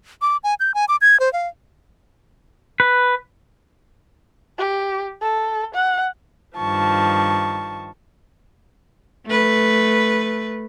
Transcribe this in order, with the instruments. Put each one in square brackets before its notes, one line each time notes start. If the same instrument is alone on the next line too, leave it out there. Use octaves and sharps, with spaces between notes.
[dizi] D6
G#5
G6
G#5
D6
G#6
C5
F5
[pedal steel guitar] B4
[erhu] G4
A4
F#5
[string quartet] G2 D#3 F3 A5 C#6
[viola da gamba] A3 B4